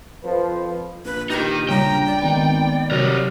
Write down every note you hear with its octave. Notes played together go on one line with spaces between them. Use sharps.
F2 F3 B4
A#1 B4
D#4 G4 A#4
C#3 G3 D4 G5 A#5
D5
G#1 D#3 A#3 B3
C3 F#3 G3 A#4